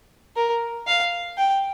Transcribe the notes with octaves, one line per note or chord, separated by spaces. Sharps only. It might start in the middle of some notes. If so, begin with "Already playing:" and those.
A#4
F5
G5